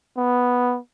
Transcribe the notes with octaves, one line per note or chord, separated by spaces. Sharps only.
B3